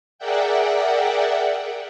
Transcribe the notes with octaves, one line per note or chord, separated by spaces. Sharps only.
G#4 A#4 D5 E5 F#5 G5